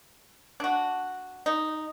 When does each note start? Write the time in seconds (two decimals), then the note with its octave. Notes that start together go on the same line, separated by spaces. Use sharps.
0.60 D4 F#4
1.46 D#4